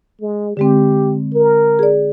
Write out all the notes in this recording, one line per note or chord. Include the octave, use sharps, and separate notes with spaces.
G#3
D3 G#3 C4 G4
A#4
G#4 D5